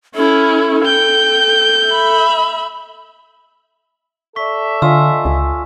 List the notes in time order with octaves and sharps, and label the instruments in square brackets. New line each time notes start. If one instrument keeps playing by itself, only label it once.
[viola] C#4 E4 [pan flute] A4
[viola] G5 [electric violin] G6
[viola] E5 B5
[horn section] A4 D5 E5 [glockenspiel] C#6 B6
[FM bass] D3 [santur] F4 D#5 G#5 [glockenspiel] E6
[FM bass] C#2 [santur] G#5